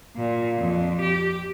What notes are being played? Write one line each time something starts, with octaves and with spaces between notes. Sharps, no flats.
A#2
F2
G4